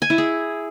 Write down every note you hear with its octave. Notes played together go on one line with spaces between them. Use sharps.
G#5
E4
G#4